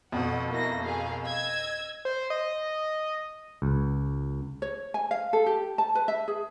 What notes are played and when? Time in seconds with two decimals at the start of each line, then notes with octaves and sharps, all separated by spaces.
0.12 F2 B2 F#5
0.51 A#3 E4 A#6
0.82 G#4 A#4 F5
1.23 D#5 E6 G#6
2.05 C5
2.30 D#5
3.62 C#2
4.62 C#5
4.94 G#5
5.11 F5
5.33 A4
5.46 G4
5.78 A5
5.95 B4
6.08 E5
6.28 G#4